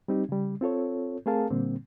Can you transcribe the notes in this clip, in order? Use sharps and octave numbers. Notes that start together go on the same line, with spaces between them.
G3 C4 D#4 G4
C#3 G3
C4 F4 A4 C#5
A3 C4 G#4 A#4 F5 A5
A#2 D3 G3 A#3 C4